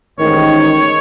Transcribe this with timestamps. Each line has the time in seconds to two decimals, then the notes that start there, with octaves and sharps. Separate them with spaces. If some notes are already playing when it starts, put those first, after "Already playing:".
0.19 A1 G#2 D#3 C#5